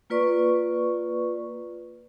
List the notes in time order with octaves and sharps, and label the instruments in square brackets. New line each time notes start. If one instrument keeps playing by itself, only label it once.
[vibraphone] A#3 F4 B4 D5 C#6